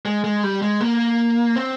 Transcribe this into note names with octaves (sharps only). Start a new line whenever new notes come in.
G#3
G#3
G3
G#3
A#3
C4